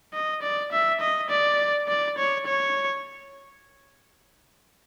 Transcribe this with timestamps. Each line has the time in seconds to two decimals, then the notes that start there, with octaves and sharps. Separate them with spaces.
0.13 D#5
0.43 D5
0.72 E5
1.01 D#5
1.30 D5
1.88 D5
2.18 C#5
2.46 C#5